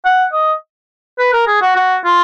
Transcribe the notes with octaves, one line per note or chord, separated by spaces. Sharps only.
F#5
D#5
B4
A#4
G#4
F#4
F#4
F4